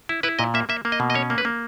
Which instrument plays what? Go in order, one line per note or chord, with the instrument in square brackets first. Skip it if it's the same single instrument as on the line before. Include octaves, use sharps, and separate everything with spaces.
[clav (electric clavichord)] E4
E4 B4
A#2 D#5
A#3 E5
A#3 E5
A#3
D#5
B2
D#5
C#4 C#5
A#3
B4
A#3